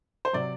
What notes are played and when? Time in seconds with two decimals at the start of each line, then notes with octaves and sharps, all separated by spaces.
0.25 C5
0.33 C3 F#3 D5